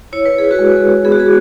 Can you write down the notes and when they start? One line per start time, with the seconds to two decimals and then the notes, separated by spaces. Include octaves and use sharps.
0.13 E4 C#5
0.26 B4
0.38 G#4
0.51 F#4 B4
0.59 G#3
1.05 B3 G#4
1.12 F#4
1.20 G#4